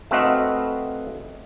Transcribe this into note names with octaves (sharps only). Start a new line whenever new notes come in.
A3 C4 F#4 B4 D#5 F5